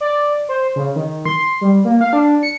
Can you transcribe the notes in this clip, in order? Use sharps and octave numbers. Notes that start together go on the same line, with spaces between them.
D5
C5
C#3
D#3
C6
G3
A#3
F5
D4
C#7